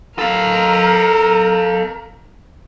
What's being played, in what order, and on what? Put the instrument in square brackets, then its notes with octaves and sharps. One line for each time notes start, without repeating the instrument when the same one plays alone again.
[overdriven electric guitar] A4 F5 [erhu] A#4